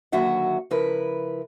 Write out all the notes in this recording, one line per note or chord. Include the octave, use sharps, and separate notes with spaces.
D#2 D3 F#3 F#4 E5 F#5
C#3 F3 E4 A#4 B4